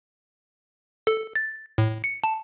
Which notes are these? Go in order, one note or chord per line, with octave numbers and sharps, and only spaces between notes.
A4
A6
A2
C#7
A5